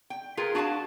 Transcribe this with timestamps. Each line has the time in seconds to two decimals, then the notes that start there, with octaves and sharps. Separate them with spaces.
0.10 G5
0.37 F4 G#4 A#4 B4
0.55 D4 F#4 G#4 F5 A5